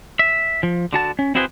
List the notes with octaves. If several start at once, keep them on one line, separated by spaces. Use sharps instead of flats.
E5
F3
D3 F#4 A5
C#4
C4 E4 F#4 G#4 B4 C5